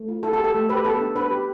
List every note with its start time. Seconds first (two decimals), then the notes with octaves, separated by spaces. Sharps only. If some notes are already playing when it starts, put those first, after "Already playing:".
Already playing: A3
0.08 F4
0.23 E4 A4
0.33 A4
0.39 G4
0.44 A4
0.54 A3
0.69 G4 B4
0.85 B3 A4
1.00 D4
1.16 D4 B4
1.31 G4